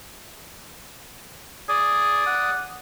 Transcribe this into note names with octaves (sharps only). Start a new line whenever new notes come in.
G#4 D5 D#6
F#5